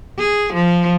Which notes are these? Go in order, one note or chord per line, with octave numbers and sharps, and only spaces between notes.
G#4
F3